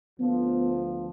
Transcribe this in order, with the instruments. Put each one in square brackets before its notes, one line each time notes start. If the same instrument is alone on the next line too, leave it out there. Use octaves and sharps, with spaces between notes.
[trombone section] D2 F3 [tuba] B3